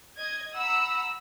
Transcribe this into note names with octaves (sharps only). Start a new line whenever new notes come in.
D#5 G#6
F#5 A#5 B5 E6